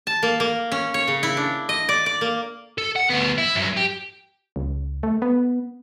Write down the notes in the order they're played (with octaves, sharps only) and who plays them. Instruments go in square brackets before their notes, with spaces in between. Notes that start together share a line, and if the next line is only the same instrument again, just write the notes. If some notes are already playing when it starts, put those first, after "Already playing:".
[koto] A5
A#3
A#3
C#4
C#5
C#3
E4
D4
D#5
D5
D5
A#3
[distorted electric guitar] A4
F#5
D2 B3
E4
G2 F#3
G4
[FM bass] C#2
A3
B3